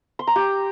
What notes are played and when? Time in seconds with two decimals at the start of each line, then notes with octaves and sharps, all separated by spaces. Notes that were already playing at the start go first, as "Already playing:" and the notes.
0.19 C6
0.27 A#5
0.36 G4